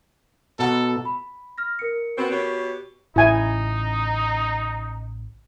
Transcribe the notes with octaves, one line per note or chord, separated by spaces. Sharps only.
B2 A4 F#5 A#5
B5
F6 A#6
A#4 C#7
B2 B3 C4
B2 G4 C#5
A1 A2 C#3 D#4 E4 G#5